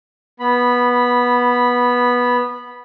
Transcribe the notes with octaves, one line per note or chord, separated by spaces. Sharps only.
B3 B5